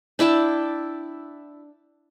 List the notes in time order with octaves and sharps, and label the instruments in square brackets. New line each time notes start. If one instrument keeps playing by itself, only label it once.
[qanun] D4 E4 G5 A5